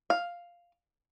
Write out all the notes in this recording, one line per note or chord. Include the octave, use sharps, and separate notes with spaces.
F5